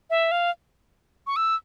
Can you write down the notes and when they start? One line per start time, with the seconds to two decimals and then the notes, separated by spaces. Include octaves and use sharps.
0.10 E5
0.32 F5
1.27 C#6
1.36 E6